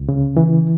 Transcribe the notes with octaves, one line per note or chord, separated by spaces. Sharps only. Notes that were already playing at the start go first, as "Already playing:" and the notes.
Already playing: C#2
C#3
E3